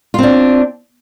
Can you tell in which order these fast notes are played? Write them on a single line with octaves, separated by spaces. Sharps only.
F4 C4 D4